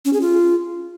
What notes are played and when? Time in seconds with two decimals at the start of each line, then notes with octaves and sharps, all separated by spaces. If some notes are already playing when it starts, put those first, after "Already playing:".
0.05 C#4
0.13 G#4
0.21 F4